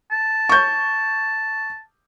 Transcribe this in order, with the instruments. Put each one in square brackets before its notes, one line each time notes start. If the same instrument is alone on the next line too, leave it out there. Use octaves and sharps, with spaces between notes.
[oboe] A5
[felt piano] C#6 G6